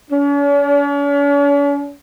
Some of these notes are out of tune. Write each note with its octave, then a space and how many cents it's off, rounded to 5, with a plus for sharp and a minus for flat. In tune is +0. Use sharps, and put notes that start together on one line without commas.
C#4 +45